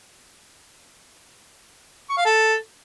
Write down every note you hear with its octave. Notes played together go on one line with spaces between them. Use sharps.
C#6
F5
A4